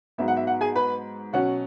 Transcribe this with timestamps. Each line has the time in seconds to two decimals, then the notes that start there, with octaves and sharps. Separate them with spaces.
0.18 G#2 F#3 B3 E5
0.28 F#5
0.37 E5
0.47 F#5
0.61 G#4 G#5
0.76 B4 B5
1.33 B2 F#3 C#4 F#5